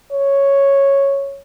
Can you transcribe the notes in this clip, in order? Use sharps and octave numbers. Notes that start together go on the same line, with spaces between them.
C#5